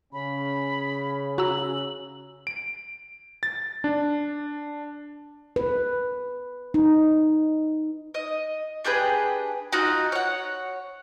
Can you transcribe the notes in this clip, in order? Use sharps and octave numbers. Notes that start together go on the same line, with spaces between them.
C#3 C#4 B5
F#4 A#5 E6 F#7
D7
A6
D4
B4
D#4
D#5
D4 G4 G#4 B4
D#4 F4 F#4
C#5 F#5